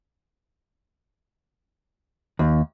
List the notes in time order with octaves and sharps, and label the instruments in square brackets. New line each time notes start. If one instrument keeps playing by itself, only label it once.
[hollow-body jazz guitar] D#2